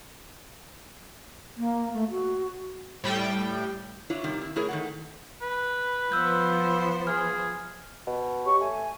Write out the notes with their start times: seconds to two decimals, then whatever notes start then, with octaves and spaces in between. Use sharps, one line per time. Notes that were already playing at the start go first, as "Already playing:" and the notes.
1.57 A#3
1.94 A3
2.10 F#4
3.04 A2 G3 G5
4.10 D4 E4 F4 C#5
4.24 C3 D#3 G3 A#3
4.42 E4
4.56 A3 E4 G#4 A#4 C#5
4.69 D#3 A3 F#5
5.42 B4
6.12 F3 B3 C5 E6 G6
7.07 G#4 F6
8.07 B2
8.45 G4 C#5 C#6
8.60 A3 G#5